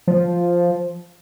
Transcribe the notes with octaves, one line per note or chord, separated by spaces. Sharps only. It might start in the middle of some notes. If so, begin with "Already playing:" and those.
F3